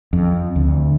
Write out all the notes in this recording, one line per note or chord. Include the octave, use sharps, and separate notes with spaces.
F2
D2